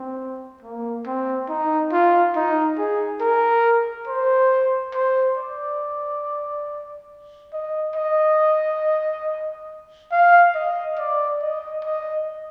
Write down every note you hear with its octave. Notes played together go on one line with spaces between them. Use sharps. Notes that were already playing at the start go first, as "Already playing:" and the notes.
Already playing: C4
A#3
C4
D#4
F4
D#4
G#4
A#4
C5
C5
D5
D#5
D#5
F5
D#5
D5
D#5
D#5